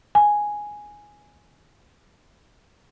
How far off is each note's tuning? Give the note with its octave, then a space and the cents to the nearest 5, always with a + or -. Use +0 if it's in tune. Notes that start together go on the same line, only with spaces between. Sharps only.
G#5 +0